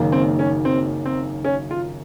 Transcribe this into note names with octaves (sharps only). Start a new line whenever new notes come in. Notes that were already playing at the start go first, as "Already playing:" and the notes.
Already playing: F#1 F#2 D#3 A#3 D#4
C4
C#4
C4
C4
C#4
F4